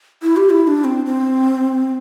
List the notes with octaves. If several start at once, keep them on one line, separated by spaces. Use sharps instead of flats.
E4
G4
E4
E4
D4
C4
C4